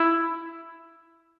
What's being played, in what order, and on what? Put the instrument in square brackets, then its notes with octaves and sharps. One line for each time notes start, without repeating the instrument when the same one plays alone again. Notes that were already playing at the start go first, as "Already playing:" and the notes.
Already playing: [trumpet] E4